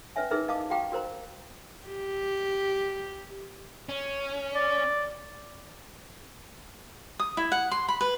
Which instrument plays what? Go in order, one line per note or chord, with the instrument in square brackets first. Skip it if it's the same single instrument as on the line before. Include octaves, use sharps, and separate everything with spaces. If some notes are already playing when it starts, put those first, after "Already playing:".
[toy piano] C#4 B4 C#5 E5 G#5
D#4 E4 G#4 A#4 B4 E5
D#5 F5 A5 D6 D#6
F#4 G4 F5 G5 A#5 D6
F#4 A#4 C5 A#5
[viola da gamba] G4
[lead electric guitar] C#4
[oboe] D5
[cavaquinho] D#6
E4
F#5
C6
B5
B4